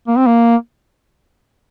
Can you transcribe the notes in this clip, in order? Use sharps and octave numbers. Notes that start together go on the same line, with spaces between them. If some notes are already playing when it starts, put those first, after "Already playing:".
A#3
C4
A#3